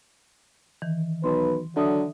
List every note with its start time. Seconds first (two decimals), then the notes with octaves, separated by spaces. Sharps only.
0.82 D#3 E3
1.24 B1 B4 C6
1.76 D3 F#3 E5 D#6